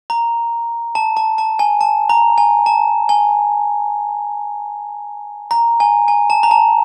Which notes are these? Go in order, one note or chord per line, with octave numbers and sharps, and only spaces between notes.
A#5
A5
A5
A5
G#5
A5
A#5
G#5
A5
G#5
A#5
G#5
G#5
A5
A#5
A5